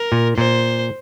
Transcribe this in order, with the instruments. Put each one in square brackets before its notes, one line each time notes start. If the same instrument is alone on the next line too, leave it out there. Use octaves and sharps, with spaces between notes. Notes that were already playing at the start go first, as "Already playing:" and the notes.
Already playing: [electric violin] A#4
[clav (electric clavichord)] A#2
[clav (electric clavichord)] A#2 [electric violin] C5